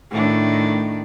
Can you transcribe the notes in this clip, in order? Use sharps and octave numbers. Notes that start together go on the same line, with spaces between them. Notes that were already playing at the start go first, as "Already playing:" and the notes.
A2 D#3 D4